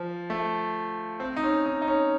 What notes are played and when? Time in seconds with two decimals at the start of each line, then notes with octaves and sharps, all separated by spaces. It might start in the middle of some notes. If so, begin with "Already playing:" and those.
Already playing: F3
0.30 A3
1.20 C4
1.36 D#4
1.44 C#4
1.66 D#4
1.82 D#4
1.88 C#4